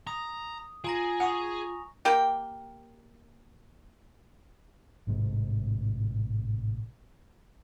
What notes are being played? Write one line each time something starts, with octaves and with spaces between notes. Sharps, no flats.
A#5 D#6
F4 G#4 G#5 A#5 A#6
F#5 C#6 D#6 F7
A#3 G4 G5
A1 G#2 C3 G#3